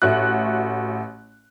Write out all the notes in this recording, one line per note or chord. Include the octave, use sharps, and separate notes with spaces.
A1 A3 F#4 F#6